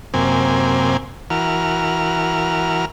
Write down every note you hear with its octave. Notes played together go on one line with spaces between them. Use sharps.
F#2 C3 A#3 C4 G#5
E3 F#4 A#4 F6